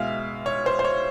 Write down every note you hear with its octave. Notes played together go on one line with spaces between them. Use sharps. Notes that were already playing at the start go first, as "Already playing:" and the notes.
Already playing: B2 G#3 E5 F5
C#5
C5
C5
C#5